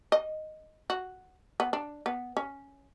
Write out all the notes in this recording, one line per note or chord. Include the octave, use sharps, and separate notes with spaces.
D#5
F#4
B3
D4
B3
C#4